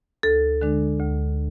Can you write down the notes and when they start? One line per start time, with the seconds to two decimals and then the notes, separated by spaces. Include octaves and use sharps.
0.23 D2 A4
0.62 D3 G#3 D4
1.00 D2